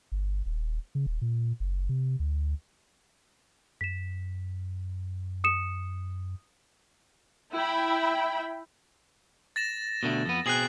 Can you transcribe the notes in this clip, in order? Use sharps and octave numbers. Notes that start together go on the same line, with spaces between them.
G1
D#1
C#3
D#1
A#2
F#1
C3
D2
F#2 B6 E7
D#6 C#7 E7
E4 E5 G5 B5
A6 A#6 E7
B2 D3 A3
F2 B3
B2 C4 G#4 F#6 C7 F#7